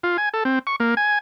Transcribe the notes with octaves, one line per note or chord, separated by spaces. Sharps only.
F4
G#5
A4
C4
C#6
A#3
G#5